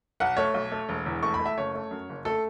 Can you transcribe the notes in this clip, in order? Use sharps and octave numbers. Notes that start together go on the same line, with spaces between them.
B1 F#5
A3 C#5
B1
A3
E1
E2
A3 C#6
B5
A3
E5
F#1 C#5
A3
F#2
F#1
A3 A4